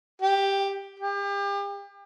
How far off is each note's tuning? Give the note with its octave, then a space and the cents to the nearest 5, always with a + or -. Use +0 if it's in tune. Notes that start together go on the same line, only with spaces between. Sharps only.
G4 +5
G4 +35